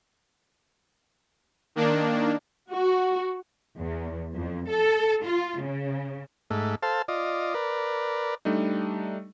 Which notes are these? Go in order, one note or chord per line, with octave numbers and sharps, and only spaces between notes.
D#3 A#3 D4
F#4
E2
F2
A4
F4
C#3
G#2 A3
A4 C5 F5 A5
F4 D5 D#5
A#4 B4 D5
G3 A3 D4 D#4